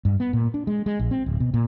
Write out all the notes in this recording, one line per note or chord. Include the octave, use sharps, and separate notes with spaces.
G2
B3
A#2
D4
G#3
G#3
A#1
C4
D1
B2
A#2